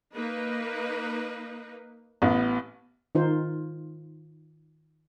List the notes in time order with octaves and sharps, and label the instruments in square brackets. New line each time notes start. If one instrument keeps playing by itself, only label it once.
[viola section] A#3 D#4 B4
[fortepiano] A1 [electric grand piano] B3
[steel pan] D#3 D#4 F4 C5